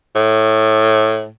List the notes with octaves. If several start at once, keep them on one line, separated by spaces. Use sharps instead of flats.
A2